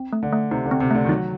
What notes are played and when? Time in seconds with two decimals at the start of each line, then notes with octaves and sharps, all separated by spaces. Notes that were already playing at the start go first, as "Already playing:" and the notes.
Already playing: C4
0.12 A3
0.23 D3
0.33 A3
0.51 C3 D#4
0.66 D3
0.71 C4
0.80 C3
0.91 D3 A3
1.05 D#3
1.09 F#3 D#4